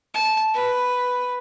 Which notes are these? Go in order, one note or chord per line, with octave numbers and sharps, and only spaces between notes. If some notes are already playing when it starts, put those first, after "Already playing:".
A5
B4